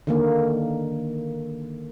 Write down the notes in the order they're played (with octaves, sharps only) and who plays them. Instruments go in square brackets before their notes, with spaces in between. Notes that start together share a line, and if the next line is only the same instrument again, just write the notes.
[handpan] D3 D#3 A#3